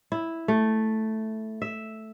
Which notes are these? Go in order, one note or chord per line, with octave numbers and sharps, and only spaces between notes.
E4
A3
E5